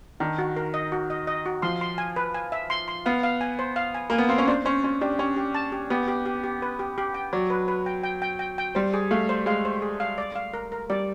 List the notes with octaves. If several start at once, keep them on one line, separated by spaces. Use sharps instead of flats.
D#3 D4
F#4
A#4
D#5
F#4
D#5
D#5
F#4
F3 C6
C6
G#5
B4
G#5
E5
C6
C6
B3 F5
F5
G#5
C5
F5
G#5
A#3 G#5
B3
C4 F5
C#4
D4 C5
C#4 C5
C#4 C5
D4 G4
C#4 G4
G4
A5
G4
B3 G4
G4
G4
G4
B4
G4
G4
G5
F#3 D5
B4
B4
G5
G5
G5
G5
G5
G3 C5
G#4
A3 F5
C5
G#3 F5
C5
G#4
F5
D5
F5
A#4
A#4
G3 D5